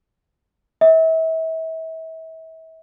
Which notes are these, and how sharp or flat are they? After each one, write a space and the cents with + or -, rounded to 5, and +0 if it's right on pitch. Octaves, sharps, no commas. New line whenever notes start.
E5 -35